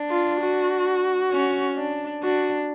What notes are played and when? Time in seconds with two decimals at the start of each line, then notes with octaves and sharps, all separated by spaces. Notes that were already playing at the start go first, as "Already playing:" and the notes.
Already playing: D4
0.10 F4
0.40 F#4
1.32 C#4
1.77 D4
2.23 D4 F#4